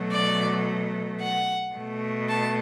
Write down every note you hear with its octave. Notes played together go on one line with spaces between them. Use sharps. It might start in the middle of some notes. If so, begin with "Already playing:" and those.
Already playing: B2 F#3 A3
D5
F#5
B2 A3
A5